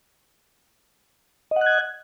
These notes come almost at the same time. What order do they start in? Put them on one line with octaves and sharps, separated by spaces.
D#5 F#5 F#6 G#6